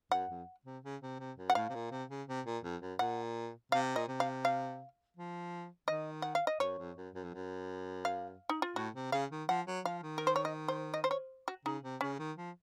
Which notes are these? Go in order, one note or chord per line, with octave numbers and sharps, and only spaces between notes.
F#2 F#5
F2
C3
C#3
C3
C3
F#2
F#5
A2 F5
C3
A#2
C3
C#3
C3
A#2
F2
F#2
A#2 F#5
C3 F5
A#2 D#5
C3
F5
F5
F3
D#3 D#5
F#5
F5
D#5
F#2 C#5
F2
F#2
F#2
F2
F#2
F5
D#4
F4
A2 F#4
C3
C#3 F5
D#3
F3 F#5
F#3
F3 F5
D#3
A#4
C5
C#5
D#5
C5
D#5
C5
C#5
F#4
C#3 D#4
C3
C#3 C#4
D#3
F3